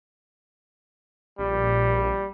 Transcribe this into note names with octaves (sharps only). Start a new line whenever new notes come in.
A#1 G3